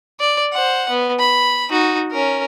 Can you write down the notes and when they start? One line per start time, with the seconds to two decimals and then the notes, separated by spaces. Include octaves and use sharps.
0.20 D5
0.53 C5 F#5
0.89 B3
1.19 B5
1.70 D#4 F#4
2.12 C#4 A#4